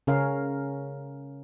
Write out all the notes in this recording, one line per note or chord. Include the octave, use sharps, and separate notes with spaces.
C#3 C#4 A#4 F5